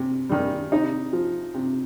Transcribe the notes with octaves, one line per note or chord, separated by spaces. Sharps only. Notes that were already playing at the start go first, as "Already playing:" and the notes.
Already playing: C3
D#3 G3
C3 D#4
F3
C3